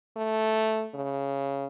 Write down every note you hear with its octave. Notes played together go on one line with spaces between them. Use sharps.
A3
C#3